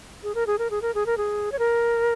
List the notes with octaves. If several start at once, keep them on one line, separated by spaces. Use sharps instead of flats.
G#4
A#4
G#4
A#4
G#4
A#4
G#4
A#4
G#4
C#5
A#4